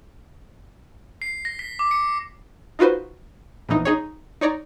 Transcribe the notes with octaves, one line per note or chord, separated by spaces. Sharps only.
C7
A#6
B6
D6
C#7
D#4 F4 F#4 B4 C5
A#1 E2 A#2 E3 D#4
D#4 G#4 C#5
D#4 C#5 D5 A#5